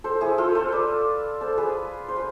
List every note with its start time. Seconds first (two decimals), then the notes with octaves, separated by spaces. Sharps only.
0.04 A4 C5
0.21 E4 G#4
0.38 F4 A4
0.55 A4 C5
0.72 B4 D5
1.41 A4 C5
1.57 G#4 B4
2.08 C5
2.16 B4